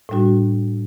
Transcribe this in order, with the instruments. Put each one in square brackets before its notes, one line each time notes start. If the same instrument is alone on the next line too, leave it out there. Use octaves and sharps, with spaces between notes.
[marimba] A2 G3 D4 F#4